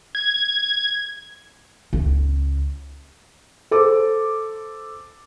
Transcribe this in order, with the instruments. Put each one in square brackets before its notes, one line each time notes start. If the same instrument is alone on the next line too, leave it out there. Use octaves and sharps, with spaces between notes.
[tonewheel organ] G#6
[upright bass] C#2
[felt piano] A4 C5 D6